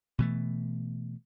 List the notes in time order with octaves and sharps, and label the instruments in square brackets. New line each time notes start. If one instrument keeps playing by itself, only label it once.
[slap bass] B2 E3 A3